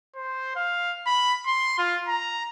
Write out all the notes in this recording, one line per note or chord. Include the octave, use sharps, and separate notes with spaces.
C5
F5
B5
C6
F4
A#5